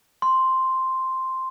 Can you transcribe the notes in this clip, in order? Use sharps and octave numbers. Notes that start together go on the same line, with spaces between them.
C6